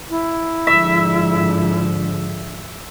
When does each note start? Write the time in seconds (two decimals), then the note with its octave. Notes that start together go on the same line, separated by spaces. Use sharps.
0.10 E4
0.67 G#2 D3 F3 E5